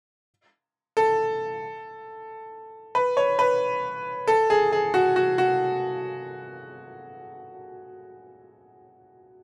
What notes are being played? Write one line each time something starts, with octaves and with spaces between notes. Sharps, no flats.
A4
B4
C#5
B4
A4
G#4
G#4
F#4
F#4
F#4